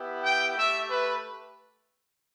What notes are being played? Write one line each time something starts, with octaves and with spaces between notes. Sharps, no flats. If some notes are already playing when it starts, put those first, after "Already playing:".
Already playing: B3 E4 G4
G5
A3 G4 E5
B4